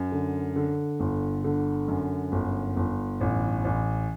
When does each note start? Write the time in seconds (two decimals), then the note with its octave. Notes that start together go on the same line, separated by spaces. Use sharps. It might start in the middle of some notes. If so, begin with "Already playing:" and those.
Already playing: F#2
0.12 D3
0.56 D3
1.00 G1
1.44 D3
1.88 F#2
2.32 G1
2.77 G1
3.21 A1
3.64 A1